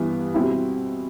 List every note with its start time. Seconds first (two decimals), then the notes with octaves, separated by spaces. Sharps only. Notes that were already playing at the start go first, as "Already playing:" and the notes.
Already playing: G2 E3 B3
0.34 B2 G3 C4 E4